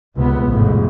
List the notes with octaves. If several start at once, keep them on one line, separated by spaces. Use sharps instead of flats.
C#2 C3 B3
A1 F2 G#2